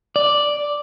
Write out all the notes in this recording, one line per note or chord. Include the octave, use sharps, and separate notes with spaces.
D5